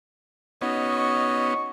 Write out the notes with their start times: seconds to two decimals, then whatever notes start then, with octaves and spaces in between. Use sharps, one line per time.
0.62 B3 C#4 D#4 F#4 C#5 D#5
0.96 C#6